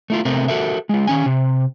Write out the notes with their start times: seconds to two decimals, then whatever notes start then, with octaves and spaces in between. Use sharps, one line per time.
0.10 A3 E4 F4
0.25 C3 A3 B3 C4 A#4
0.48 F#4 A4 A#4 E5
0.89 G#3 F4
1.07 D#3 C#4 G#5
1.26 C3